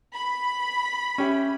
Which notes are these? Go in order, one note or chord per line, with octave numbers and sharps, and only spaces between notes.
B5
C#4 G4 E5